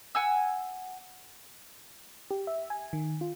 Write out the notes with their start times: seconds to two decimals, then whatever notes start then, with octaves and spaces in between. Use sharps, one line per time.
0.15 F#5 G#5 E6
2.31 G4
2.47 E5
2.70 G#5
2.93 D#3
3.21 F4